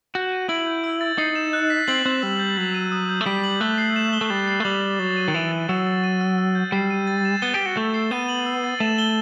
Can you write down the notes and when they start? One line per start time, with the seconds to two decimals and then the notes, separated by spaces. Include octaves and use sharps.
0.15 F#4 G6
0.32 D#7
0.49 E4 F#7
0.67 G6
0.84 E6
1.01 A6
1.18 D#4 C7
1.36 E7
1.53 F#6
1.70 B6
1.88 C4 F#7
2.05 C4 F#6
2.22 G3 E6
2.39 G6
2.57 F#3 B6
2.74 D#7
2.92 D#6
3.09 G6
3.21 A3
3.26 G3 B6
3.44 F#7
3.60 A3 F#6
3.78 C7
3.96 E7
4.13 G7
4.21 A3
4.30 G3 A6
4.47 C7
4.60 A3
4.65 G3 F#7
4.82 A6
4.99 F#3 A6
5.17 D#7
5.28 D#3
5.34 E3 F#7
5.51 A6
5.69 F#3 E6
5.87 A6
6.04 D#7
6.21 E6
6.38 E6
6.55 G6
6.72 G3 C7
6.90 D#7
7.07 A6
7.25 E7
7.42 B3 G7
7.54 G4
7.60 A6
7.66 F#4
7.77 A3 G6
7.94 C7
8.11 B3 D#7
8.29 F#7
8.46 E6
8.64 A6
8.80 A3 E7
8.98 G7